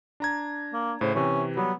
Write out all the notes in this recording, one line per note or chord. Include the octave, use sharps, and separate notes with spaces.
D4 A#5 G#6
A#3
A2 C#3 C5
C3 E3 C#4
F#3 G3 B3 F#4